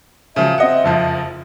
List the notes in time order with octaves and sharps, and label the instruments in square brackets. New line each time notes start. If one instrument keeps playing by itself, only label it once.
[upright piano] C#3 F3 F#3 [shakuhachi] E5
[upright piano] C4 D#5 F#5
F#1 F2 F3